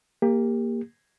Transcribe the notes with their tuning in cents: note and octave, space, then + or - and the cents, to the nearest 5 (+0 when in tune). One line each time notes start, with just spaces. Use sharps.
A#3 +0 G4 +25